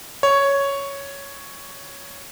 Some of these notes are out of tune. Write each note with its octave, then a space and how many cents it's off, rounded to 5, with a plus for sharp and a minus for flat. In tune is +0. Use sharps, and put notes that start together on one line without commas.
C#5 +5